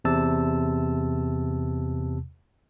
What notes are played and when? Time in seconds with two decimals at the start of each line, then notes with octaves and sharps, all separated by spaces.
0.05 E2 C3 A5 E6